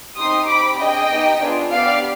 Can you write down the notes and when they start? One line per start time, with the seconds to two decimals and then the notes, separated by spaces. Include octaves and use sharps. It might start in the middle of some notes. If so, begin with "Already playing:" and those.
0.17 C4 D#4 G4 C6 D#6
0.47 C4 G4 B5 D6
0.78 D4 G#4 D#5 G5
1.09 B3 D#4 G4
1.40 B3 D4 F4 G#4
1.70 B3 D4 G4 D5 F5